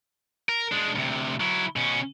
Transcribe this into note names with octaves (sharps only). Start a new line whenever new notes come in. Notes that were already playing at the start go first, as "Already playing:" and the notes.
A#4
G#3 D4
D2 C3
F#3 E4
B2 C#4